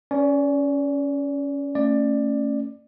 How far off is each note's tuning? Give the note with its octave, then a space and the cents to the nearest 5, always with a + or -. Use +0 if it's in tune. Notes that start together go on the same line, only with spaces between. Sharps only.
C#4 +10 B4 -5 D5 -30
A3 +30 C#4 +0 D5 +15